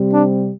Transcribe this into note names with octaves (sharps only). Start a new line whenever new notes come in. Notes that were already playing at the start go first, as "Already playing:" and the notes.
Already playing: C3 G3 C4
D4